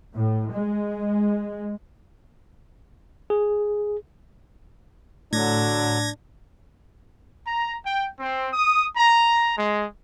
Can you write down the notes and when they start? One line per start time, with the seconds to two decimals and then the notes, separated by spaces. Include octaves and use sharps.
0.14 A2
0.52 G#3
3.30 G#4
5.33 A2 D3 F#3 D4 G#6 A#6
7.45 A#5
7.84 G5
8.20 C4
8.53 D#6
8.96 A#5
9.57 G#3